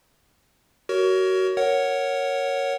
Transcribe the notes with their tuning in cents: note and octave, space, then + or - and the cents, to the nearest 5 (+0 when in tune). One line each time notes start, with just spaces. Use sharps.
F#4 +25 A#4 +0 C#5 +15
A#4 +0 C#5 +0 F#5 +0